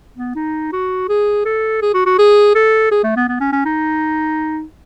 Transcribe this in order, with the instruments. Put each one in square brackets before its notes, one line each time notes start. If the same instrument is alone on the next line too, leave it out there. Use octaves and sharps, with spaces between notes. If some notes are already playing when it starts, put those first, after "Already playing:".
[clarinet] B3
D#4
F#4
G#4
A4
G#4
F#4
F#4
G#4
A4
G#4
A3
B3
B3
C#4
C#4
D#4